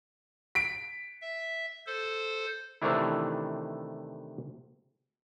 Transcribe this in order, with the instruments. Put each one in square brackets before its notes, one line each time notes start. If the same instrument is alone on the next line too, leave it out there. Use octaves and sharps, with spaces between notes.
[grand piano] B6 D7
[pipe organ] E5
A4 C5
[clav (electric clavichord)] C3 D#3 E3 A3 D4 E4